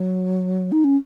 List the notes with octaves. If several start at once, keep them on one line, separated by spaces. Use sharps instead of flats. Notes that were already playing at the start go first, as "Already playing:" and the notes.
Already playing: F#3
D#4
C#4